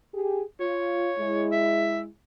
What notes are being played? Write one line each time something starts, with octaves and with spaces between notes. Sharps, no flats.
G4 G#4
F4 C#5
G#3 E4
E5